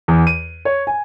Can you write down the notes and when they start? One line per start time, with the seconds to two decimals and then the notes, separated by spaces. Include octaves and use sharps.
0.08 E2
0.27 D#7
0.65 C#5
0.87 G#5